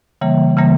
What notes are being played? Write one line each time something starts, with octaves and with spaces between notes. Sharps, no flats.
C#3 E3 G3 A#3
C#3 E3 G3 A#3